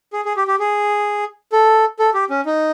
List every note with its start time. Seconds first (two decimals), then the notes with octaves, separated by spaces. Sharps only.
0.13 G#4
0.25 G#4
0.37 G4
0.47 G4
0.59 G#4
1.52 A4
1.99 A4
2.14 G4
2.30 C#4
2.46 D#4